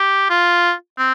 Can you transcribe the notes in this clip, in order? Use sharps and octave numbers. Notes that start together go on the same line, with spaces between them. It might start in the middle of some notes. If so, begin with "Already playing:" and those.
Already playing: G4
F4
C4